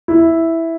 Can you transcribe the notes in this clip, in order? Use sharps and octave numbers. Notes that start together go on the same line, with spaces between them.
E4